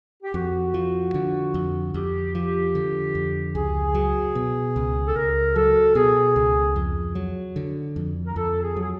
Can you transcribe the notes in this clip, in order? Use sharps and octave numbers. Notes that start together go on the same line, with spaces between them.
G4
F2 F#4
F3
D3
F2
F2 G4
F3
D3
F2
C#2 G#4
F#3
B2
C#2
A4
C#2 A#4
F#3 A4
B2 G#4
C#2
F2
F#3
D3
F2
A#4
F2 A4
G#4
F#3
G#4